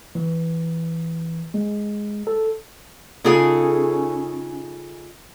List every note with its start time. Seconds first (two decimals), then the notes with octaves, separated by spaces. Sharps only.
0.15 E3
1.54 G#3
2.27 A4
3.24 C#3 C#4 D#4 F4 G#4 A4 G5